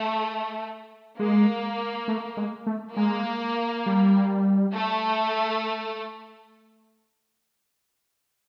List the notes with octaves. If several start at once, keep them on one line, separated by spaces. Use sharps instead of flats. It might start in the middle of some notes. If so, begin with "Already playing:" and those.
Already playing: A3
G#3 A#3
A3
G#3
A3
G#3 A#3
G3
A3